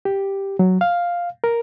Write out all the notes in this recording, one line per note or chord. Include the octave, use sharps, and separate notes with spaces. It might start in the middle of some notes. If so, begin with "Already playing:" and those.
G4
F#3
F5
A#4